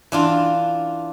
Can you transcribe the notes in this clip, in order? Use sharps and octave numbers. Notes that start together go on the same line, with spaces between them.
E3 D4 F4